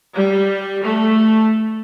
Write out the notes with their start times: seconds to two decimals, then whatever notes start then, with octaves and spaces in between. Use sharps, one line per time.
0.15 G3
0.82 A3